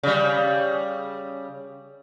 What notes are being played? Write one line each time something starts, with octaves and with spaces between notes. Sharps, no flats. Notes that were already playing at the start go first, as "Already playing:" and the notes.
C#3 G3